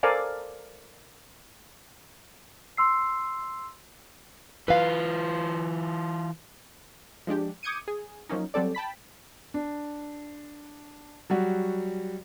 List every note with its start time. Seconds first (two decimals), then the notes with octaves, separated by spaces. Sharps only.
0.03 A4 A#4 C5 D5 F5 G#5
2.77 C6 E6 C7
4.68 E3 F4 B4 F5
7.27 F3 G#3 D4 G4
7.63 D6 D#6 G6 G#6 C#7 D#7
7.88 G#4
8.29 F3 F#3 A#3 C#4 D#4
8.54 F#3 G3 C4 A4 D5
8.75 G5 A5 B5 B6
9.54 D4
11.30 F#3 G3 F#4